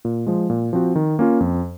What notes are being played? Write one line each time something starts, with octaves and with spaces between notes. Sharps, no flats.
A#2
F3 G#3
A#2
F3 C4 F#4
D#3
A#3 C#4 F4
F2